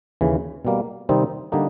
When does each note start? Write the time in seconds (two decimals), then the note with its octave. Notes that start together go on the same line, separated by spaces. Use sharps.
0.21 D#2 C#3 E3
0.65 B2 G3 A#3
1.09 C3 D#3 G3 C4 D#4
1.52 D3 G3 A#3 D#4